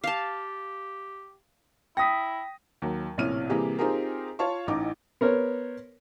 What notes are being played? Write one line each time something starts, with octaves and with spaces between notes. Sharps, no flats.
G4 F5 A5
E4 G5 D#6 A#6 B6
D#2 F#3
A#1 A2 C3 C#4 F6 D#7
C3 E3 G3 A#3 G4 G#4
C4 D#4 F4 G4 G#4 A#4
F4 C#5 F5 A5 C#6
A1 A2 D#4 D6
B3 A#4 C5 C#5